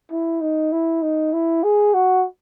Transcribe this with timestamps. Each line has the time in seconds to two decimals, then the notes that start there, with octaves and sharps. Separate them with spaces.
0.11 E4
0.41 D#4
0.72 E4
1.02 D#4
1.33 E4
1.64 G#4
1.94 F#4